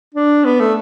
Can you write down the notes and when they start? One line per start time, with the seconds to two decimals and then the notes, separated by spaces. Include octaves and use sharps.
0.14 D4
0.45 B3
0.60 A3